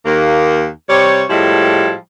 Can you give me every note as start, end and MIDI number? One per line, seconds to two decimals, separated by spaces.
0.05 0.67 39
0.05 0.67 58
0.89 1.24 48
0.89 1.24 55
0.89 1.24 73
1.29 1.93 45
1.29 1.93 53
1.29 1.93 55
1.29 1.93 56
1.29 1.93 64